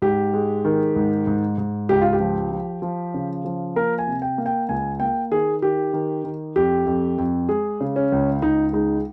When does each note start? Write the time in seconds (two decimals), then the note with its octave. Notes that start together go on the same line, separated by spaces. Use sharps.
0.02 G#2 G4
0.34 G#3
0.65 D#3
0.96 G#2
1.27 G#2
1.58 G#2
1.89 C#2 G4
2.01 F4
2.13 G4
2.20 F3
2.51 F3
2.82 F3
3.14 C#3
3.45 F3
3.76 A#3 A#4
3.99 G#5
4.07 C3
4.22 G5
4.38 A#3
4.46 G5
4.69 C#2 G#5
5.00 A#3 G5
5.31 D#3 G#4
5.62 D#3 G4
5.93 D#3
6.24 D#3
6.56 F2 G4
6.86 F2
7.18 F2
7.49 G#3 G#4
7.81 C#3
7.96 C#4
8.12 C#2
8.42 C#2 D#4
8.73 G#3 D#4